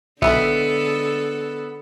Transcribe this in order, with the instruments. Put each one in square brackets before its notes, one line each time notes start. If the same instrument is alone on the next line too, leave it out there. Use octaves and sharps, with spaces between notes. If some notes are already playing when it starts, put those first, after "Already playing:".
[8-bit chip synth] B1 [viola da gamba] D3 G#3 A4 [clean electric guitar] B3 [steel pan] E5 B5